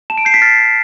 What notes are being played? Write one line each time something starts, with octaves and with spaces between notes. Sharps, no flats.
A5 E7
D7
G6 C7
B6
F6 A6
F6